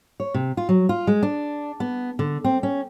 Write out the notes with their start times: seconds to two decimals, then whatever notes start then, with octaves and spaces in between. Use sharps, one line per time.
0.20 C#5
0.34 C3
0.57 F4
0.69 F#3
0.89 F4
1.07 G#3
1.23 D4
1.80 B3
2.19 D3
2.44 C4
2.63 C#4